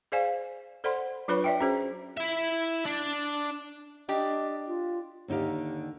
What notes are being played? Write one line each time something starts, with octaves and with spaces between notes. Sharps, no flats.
G#4 C5 D5 F5 G#5
A4 C5 D5 F#5 B5 C6
F#3 D4 F4 B4 C#5 B5
D5 E5 G5
C#4 F#4 G#4 C5
E4 E5
D4
D4 G4 D#5
F4
D#2 D3 D#4 G4 F5